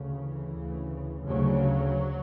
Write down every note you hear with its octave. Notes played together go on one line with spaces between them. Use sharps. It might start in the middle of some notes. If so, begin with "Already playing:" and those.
Already playing: D2 C#3
E3
D2 C#3
D2 C#3 F#3